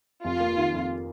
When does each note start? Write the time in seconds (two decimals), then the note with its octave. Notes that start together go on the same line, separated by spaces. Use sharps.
0.24 F1 F4
0.40 A#3
0.57 D#3
0.74 F2